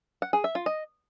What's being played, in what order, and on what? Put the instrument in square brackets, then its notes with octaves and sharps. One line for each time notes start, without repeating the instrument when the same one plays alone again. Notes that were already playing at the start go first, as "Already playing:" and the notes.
[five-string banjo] F#5
G#4
E5
F4
D#5